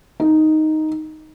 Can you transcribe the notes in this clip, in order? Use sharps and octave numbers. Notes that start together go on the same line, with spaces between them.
D#4